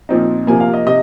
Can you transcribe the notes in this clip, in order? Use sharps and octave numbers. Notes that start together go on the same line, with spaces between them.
A#2 F3 C4 D#4
C3 F3 A#3 G#5
F5
D#5
C3 D#5